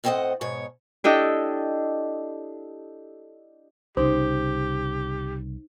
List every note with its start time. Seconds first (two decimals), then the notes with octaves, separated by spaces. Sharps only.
0.04 A2 C4 A4 C5 D#5 F#5
0.41 G#2 B2 C#5
1.04 D4 E4 G4 A4 D#5 G5
3.97 C2 C#3 D#4 G4 C5